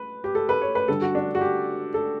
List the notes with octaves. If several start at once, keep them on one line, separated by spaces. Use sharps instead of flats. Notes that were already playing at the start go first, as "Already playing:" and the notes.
Already playing: B4
G4
A4
B4
C#5
B4
D3 G3 A4
F#4
D4
F#4
G4
A4